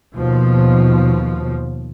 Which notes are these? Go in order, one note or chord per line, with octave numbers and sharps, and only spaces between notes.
D#2 B2 F3